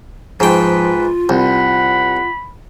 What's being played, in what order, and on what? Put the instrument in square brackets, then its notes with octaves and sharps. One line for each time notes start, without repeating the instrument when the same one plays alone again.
[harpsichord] G#2 G5 [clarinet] F3 [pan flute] F4 [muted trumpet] B4
[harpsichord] C2 [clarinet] F#5 [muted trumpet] B5